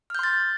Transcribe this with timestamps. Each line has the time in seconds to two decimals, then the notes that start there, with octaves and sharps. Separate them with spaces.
0.10 F6
0.15 G6
0.19 C6
0.23 A6